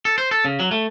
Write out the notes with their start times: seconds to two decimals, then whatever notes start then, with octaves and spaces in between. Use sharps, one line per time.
0.05 A4
0.18 C5
0.31 A4
0.45 C#3
0.60 F#3
0.71 A3